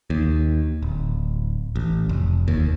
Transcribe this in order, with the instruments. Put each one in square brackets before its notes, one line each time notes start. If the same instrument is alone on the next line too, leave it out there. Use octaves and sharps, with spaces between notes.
[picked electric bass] D#2
D1
A1
F1
D#2